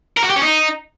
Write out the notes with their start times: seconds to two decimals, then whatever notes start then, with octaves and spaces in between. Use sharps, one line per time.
0.17 A#4
0.23 F#4
0.30 G4
0.36 C#4
0.42 D#4